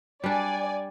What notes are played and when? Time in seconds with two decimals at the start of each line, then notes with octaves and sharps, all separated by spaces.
0.24 G3 D4 D5 G#5